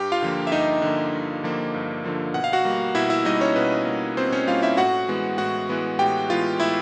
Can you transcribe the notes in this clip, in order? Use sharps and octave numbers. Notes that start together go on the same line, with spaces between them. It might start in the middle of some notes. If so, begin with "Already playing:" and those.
Already playing: G2 G4 G5
F4 F5
D3 F3 A#3
E5
G2 D#4 D#5
D3 F3 A#3
G2
D3 F3 A#3
G2
D3 F3 A#3
B2 F#5
F5
F#4 F#5
G3 A#3
B2 E4 E5
E4 E5
G3 A#3 D#4 D#5
C#4 C#5
B2 B4
G3 A#3
B2 C4 C5
C#4 C#5
G3 A#3 F4 F5
E4 E5
A2 F#4 F#5
E3 G#3 B3
A2 F#4 F#5
E3 G#3 B3
A2 G4 G5
E3 G#3 B3 F4 F5
A2 E4 E5